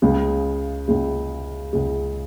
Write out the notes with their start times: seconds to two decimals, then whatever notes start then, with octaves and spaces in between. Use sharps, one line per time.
0.02 C#2 C#3 G#3
0.88 C#2 C#3 G#3
1.73 C#2 C#3 G#3